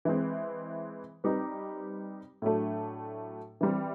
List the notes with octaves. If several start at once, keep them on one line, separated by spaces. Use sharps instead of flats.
E3 G#3 C4
G3 C4 D#4 G4 B4
A2 F#3 A3 D4
E3 G3 C4